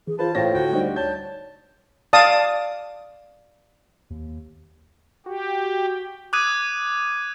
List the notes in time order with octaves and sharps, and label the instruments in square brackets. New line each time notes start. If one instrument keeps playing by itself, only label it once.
[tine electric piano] E3 [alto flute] G#4
[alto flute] F4 [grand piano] B4 C5 [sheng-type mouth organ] A5
[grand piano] A2 F4 A#6 [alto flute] C5 [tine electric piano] C#5 F5 G5
[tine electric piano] D2 [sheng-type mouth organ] F#4 G5
[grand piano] G3 D4 D#4 [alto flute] C5
[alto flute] C#5 [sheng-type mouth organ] A5 [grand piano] G6
[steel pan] D5 F5 A5 D#6
[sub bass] D#2
[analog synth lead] F#4 [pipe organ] G4
[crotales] D6 D#6 F#6 G#6 D#7